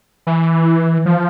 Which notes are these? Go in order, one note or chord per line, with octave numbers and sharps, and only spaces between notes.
E3
F3